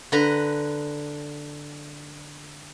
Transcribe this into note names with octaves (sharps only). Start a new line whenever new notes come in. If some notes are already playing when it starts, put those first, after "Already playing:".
D3 B4 A#5